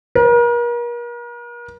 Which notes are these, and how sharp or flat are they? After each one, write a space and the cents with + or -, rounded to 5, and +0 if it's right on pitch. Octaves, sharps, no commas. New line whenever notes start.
A#4 +40